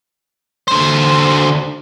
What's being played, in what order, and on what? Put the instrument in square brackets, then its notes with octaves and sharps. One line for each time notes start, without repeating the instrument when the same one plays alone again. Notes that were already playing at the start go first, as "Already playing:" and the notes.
[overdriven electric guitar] D3 C5